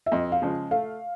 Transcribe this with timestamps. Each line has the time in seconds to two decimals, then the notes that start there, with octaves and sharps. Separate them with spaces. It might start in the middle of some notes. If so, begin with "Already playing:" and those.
0.06 E5
0.12 F2 D#5
0.32 F5
0.42 C#3 F3 G#3
0.71 A3 F5